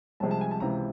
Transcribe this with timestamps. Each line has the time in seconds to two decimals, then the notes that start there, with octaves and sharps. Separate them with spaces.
0.20 C2 C3 F3 G#3 A5
0.31 A5
0.41 G#5
0.51 A5
0.60 C#2 C3 E3 A#5